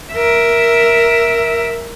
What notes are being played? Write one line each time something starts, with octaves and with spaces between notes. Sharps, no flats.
A#4 E5